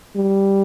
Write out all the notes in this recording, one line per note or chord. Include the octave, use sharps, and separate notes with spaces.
G3